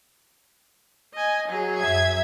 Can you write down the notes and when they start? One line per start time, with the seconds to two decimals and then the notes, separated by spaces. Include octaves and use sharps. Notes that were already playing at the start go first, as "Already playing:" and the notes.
1.14 D#5 G#5
1.48 F#3 G#4
1.78 F#2 E5 G#6